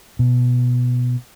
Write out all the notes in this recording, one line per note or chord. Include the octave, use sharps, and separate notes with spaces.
B2